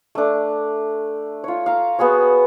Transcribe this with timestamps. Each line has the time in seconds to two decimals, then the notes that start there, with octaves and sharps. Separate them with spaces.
0.15 A3 D4
1.44 F4 C#5
1.66 F5 A#5
1.99 B3 F#4 G#4 C#5